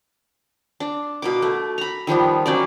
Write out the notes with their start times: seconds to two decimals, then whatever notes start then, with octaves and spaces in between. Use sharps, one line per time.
0.80 D4
1.22 B2 A#3 D6
1.42 A3
1.78 A#5 B5
2.07 D#3 F3 G3 B3
2.46 F#3 A#3 C#4 D5